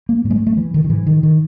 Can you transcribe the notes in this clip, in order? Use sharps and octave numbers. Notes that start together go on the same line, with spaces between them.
A#3
G#2 A#3
G#3
A3
A3
E3
D#3
D#3
G#2 E3
D#3
D#3